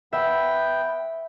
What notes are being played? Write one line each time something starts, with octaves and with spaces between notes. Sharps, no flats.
B3 E5 G5